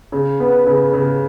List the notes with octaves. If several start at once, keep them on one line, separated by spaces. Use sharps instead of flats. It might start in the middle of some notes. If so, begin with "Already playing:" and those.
C#3
B3
C#3
C#3